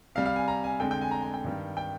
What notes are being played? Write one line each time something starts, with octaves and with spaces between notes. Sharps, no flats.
C3 G3 F5
F5
G#5
A#5
G#5
F2 D3 G#3 G5
G5
G#5
A#5
G#5
G5
G2 D#3 G3
G5